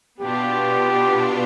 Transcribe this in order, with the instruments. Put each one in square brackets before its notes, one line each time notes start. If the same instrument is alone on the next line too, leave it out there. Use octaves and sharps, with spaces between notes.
[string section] B2 B3 D4 F4 [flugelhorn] G4